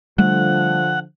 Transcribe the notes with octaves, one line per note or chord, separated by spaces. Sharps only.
D3 F3 G3 A3 F#5